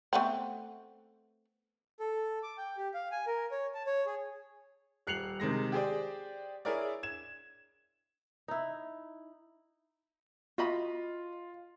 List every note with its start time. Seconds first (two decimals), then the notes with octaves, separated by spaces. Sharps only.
0.13 A3 B3 C4
2.00 A4
2.43 D6
2.58 G5
2.77 G4
2.94 F5
3.12 G#5
3.27 A#4
3.51 C#5
3.74 A5
3.87 C#5
4.06 G#4
5.07 D#1 F#6 C7 C#7 F7 F#7
5.40 C3 D#3 G#3 A#6
5.72 G4 G#4 C5 D5
6.65 E4 G#4 A#4 C#5 D5
7.03 G#6 E7
8.48 D#4 E4
10.58 F4 F#4 D#5 B5